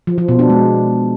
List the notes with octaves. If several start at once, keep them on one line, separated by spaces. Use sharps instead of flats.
F3
F3
B2
D4
G#3